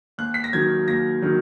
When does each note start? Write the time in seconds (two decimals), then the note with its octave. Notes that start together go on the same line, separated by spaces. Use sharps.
0.18 D#2 F#6
0.34 B6
0.44 A#6
0.53 D#3 F#3 G#6
0.88 D#2 A#6
1.22 D#3 F#3